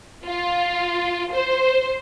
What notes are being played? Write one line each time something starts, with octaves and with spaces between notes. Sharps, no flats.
F4
C5